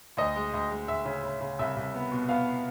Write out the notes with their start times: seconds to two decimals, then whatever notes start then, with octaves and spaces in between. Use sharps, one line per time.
0.17 D2 D#5
0.36 G#3
0.54 D2
0.70 G#3
0.88 D2 E5
1.05 C#3
1.23 C#3
1.40 C#3
1.59 C2 E5
1.76 C2
1.95 B3
2.12 B2
2.29 B3 F5